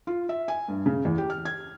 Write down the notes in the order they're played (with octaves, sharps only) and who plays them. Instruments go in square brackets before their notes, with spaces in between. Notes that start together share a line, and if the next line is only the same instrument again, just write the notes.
[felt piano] F4
E5
G#5
G2
C#3
E2
G4
F6
G#6